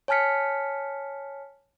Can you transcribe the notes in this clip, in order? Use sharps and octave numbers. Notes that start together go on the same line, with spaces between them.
C#5 G#5 A5 F6 B6 C#7